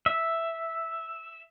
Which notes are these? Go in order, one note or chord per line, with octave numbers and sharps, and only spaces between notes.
E5